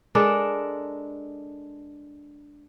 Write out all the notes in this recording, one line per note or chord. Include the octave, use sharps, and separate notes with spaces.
G#3 D4 A4 A#4